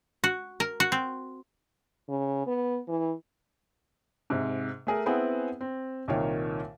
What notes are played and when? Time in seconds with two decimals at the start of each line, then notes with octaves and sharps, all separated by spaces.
0.24 F#4
0.60 A#4
0.80 F#4
0.92 C4
2.09 C#3
2.47 B3
2.88 E3
4.30 G#2 C3
4.87 A3 G#4 A#4
5.06 B3 C4 E4 G#4 F#5
5.61 C4
6.08 C2 A#2 D#3 A#4 C#5 G5